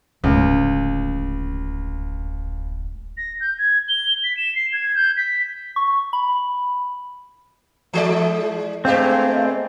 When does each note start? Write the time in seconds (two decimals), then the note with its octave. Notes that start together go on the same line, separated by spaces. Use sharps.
0.24 D1 G#1 C#2
3.17 A#6
3.40 G6
3.58 G#6
3.88 G7
4.23 B6
4.37 E7
4.55 C7
4.72 G#6
4.95 G6
5.16 B6
5.76 C#6
6.13 B5
7.93 E3 G#3 A4 D5
8.85 G2 G#3 A3 B3 C4 G4 F5